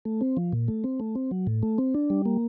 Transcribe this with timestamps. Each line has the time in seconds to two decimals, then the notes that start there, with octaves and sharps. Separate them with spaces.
0.05 A3
0.21 C4
0.37 F3
0.53 A#2
0.68 A3
0.84 C4
1.00 A3
1.15 C4
1.31 F#3
1.47 A2
1.63 A3
1.78 C4
1.94 D4
2.10 G3
2.25 A#3